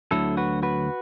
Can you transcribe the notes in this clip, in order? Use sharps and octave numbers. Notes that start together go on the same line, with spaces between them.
D2 D3 F#3 E4 A4
F#4 B4
F#4 B4